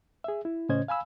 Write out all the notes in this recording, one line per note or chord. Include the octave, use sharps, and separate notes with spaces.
G#4 E5
E4
A2 C#3 C#4 C5 D#5 G#6
F5 G#5 B5 E6